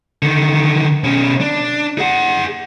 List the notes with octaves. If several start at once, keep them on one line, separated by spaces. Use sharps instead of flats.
D3 D#3
B2 C#4
D4
G#4 F#5